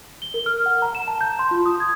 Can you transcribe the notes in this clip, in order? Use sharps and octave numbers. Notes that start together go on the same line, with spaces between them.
G7
A#4
F6
F#5
A#5
E7
A5
G6
C6
F4
D#6
G#6